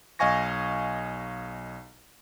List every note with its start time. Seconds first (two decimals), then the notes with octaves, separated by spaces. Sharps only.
0.19 B1 D#5 F5 G#5 C#6 A#6